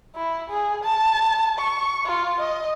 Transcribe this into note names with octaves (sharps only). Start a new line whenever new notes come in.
E4
G#4
A5
C#6
F4
D#5